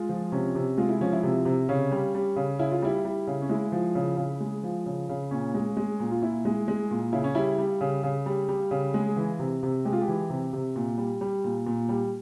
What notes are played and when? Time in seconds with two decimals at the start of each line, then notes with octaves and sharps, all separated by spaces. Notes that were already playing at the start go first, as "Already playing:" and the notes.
Already playing: G#3 F4
0.09 F3
0.32 C3 C#4
0.55 C3
0.78 G#3 F4
0.89 E4
1.01 F3 C#4
1.13 E4
1.23 C3
1.45 C3
1.69 C#3 C#4
1.92 G3
2.14 G3
2.36 C#3
2.59 C#3 E4
2.72 F4
2.82 G3 E4
3.05 G3
3.27 C#3
3.42 C#4
3.49 G#3 E4
3.72 F3
3.95 C#3
4.17 C#3
4.40 G#3
4.63 F3
4.86 C#3
5.09 C#3
5.31 A#2 C#4
5.54 G#3
5.77 G#3
6.00 A#2
6.11 F4
6.22 A#2 E4
6.45 G#3
6.68 G#3
6.91 A#2
7.13 C#3 E4
7.24 C#4
7.35 G3 E4
7.58 G3
7.81 C#3
8.04 C#3
8.26 G3
8.49 G3
8.71 C#3
8.94 G#3
9.17 E3
9.39 C3
9.63 C3
9.85 G#3 G4
9.93 F4
10.01 G4
10.08 E3
10.30 C3
10.53 C3
10.76 A#2
10.98 G3
11.21 G3
11.44 A#2
11.66 A#2
11.89 G3